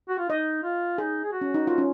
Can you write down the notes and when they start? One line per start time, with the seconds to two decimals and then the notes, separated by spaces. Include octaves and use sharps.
0.09 F#4
0.18 F4
0.30 D#4 D#5
0.63 F4
0.98 D#4 G#4
1.24 G#4
1.33 F#4
1.41 C#4
1.54 D#4
1.67 F4 F#4
1.78 C#4